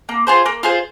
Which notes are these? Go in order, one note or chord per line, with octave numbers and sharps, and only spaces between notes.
A#3
F4 G#4 C5
A#3
F4 G#4 C5